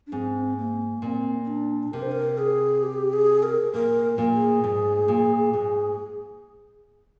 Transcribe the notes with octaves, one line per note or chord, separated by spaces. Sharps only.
D4
G#2 C4
A#3
A#2 C4
C4
D4
C3 A#4
C5
A#4
G#4
G4
G#4
A#4
A#2 A#4
A#2
G#4
G#2
A#2
G#2 G#4